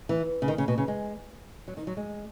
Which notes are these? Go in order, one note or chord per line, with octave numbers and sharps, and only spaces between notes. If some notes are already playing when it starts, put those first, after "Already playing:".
E3
C#3
D#3
C#3
B2
C#3
G#3
F#3
D#3
F#3
G#3